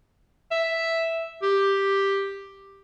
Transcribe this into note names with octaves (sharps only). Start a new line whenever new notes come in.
E5
G4